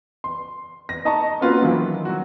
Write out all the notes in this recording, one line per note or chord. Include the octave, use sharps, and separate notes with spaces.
C6
A#6
D#4 D#5 A5 A#5 C#6
A#3 C4 C#4 F4 F#4 B4
D#3 E3 F#3
F#3 F#4